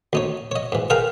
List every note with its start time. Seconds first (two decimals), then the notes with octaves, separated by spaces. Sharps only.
0.13 D2 D#4 C#5
0.51 C#5 D#5
0.72 G#2 E3
0.90 G#4 A#4 B4 F5 G5 A#5